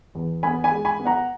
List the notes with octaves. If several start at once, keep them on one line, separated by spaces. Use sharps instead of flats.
E2
B3 G#5 B5
G#5 B5
G#3
G#5 B5
B3
F#5 A#5